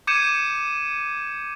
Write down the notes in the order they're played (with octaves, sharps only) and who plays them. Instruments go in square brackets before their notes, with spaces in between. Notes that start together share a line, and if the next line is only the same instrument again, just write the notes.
[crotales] D6 G6 G#6 C#7 D#7 E7